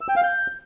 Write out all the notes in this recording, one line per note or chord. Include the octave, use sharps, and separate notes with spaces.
E6
G5
F5
G6